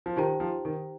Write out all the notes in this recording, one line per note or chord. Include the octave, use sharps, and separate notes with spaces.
F3
D#3 D#4 G4 C5 G5 A#5
F3
D#3